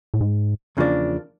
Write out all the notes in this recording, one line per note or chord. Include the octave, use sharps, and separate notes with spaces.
A2
G#2
E2 C#3 F3 A#3 D4